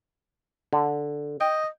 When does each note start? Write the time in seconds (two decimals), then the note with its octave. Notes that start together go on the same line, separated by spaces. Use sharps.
0.73 D3
1.41 D#5 G5